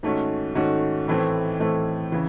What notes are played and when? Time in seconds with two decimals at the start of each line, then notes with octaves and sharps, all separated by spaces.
0.03 G#2 D#3 A3 C#4 F#4
0.55 G#2 D#3 A3 C#4 F#4
1.08 A2 E3 A3 C4
1.60 A2 E3 A3 C4
2.12 C#3 E3